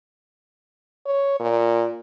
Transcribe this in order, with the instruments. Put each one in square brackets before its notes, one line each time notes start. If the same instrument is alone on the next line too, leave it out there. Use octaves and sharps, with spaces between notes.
[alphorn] C#5
A#2